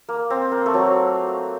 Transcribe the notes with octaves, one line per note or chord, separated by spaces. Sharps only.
A#3
C4
A#3
A3
F#3